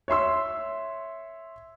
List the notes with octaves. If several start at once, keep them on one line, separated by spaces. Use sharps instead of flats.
C#5 E5 C6 E6